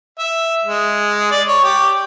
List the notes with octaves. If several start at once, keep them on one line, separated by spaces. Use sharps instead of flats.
E5
G#3
D5
C#5
G4